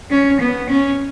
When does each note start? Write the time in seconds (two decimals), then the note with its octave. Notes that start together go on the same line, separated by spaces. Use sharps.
0.11 C#4
0.40 B3
0.69 C#4